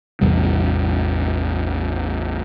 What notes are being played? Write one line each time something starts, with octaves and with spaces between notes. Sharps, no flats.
A1 E2 C3 G3